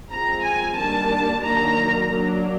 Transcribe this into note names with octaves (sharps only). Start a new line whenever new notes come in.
F3 G#3 C4 A#5
G#5
D#3 G3 A#3 D4 A5
D#3 F#3 A#3 D4 A#5
F#3 A#3 D4